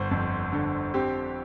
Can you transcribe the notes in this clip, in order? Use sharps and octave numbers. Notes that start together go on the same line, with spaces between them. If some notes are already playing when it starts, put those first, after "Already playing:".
Already playing: G1 C5
F2
D3
C4 G4